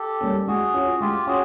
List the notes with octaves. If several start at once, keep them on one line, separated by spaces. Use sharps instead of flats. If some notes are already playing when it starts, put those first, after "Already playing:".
Already playing: G4 A4
G3 A#3 C#4
G#3 F#4 G#4
C#4 F4
G#3 F4 G4
C#4 F#4 G#4